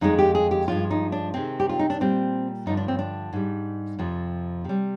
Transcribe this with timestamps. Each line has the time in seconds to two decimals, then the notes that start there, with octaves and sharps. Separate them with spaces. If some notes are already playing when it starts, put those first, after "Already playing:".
0.01 F2 D3 G#3 D#4
0.19 G4
0.35 G#4
0.51 G4
0.68 G2 F3 G#3 F4
0.91 D#4
1.12 D4
1.34 C3 D#3 G#3 C4
1.60 G4
1.69 F4
1.79 D#4
1.90 D4
2.00 A#2 G3 C4
2.66 G2 D3 F3 D#4
2.77 D4
2.88 C4
2.99 D4
3.33 G#2 G3
3.99 F2 C3 F3
4.64 C3 G3